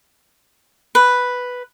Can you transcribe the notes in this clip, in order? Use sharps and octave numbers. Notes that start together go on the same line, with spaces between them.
B4